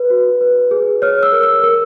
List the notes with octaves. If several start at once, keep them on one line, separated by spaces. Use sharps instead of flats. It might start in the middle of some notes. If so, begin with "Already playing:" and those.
Already playing: B4
F#4
B4
G#4
C#5 F6
E6
A#4
E6
A#4 E6